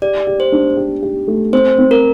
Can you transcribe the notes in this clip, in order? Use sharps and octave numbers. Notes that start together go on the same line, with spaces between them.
G4 D5
G4
C5
D4
G4
G4
A3
C4 C5
C4
A#4